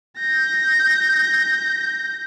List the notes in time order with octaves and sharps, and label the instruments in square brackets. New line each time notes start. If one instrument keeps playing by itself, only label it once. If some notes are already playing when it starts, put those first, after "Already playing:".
[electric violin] G6 A#6